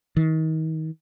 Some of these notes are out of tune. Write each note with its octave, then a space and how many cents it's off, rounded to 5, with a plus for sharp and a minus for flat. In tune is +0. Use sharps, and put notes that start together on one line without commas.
D#3 +35